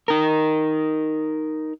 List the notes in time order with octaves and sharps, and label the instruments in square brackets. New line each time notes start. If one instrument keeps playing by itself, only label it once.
[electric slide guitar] D#4 A#4